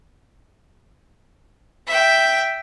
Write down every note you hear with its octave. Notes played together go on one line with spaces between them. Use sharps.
E5 G5